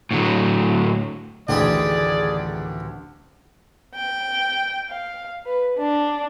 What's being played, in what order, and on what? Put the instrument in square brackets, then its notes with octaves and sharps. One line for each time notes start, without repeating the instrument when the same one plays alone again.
[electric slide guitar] A2 D3 F#3
[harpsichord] A1 D#3 G4 [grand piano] D2 [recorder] G#4 [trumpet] D5
[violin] G5
F5
B4
D4